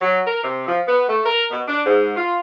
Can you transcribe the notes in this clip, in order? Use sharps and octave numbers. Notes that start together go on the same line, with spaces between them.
F#3
A#4
C3
F3
B3
A3
A#4
B2
D4
G#2
F4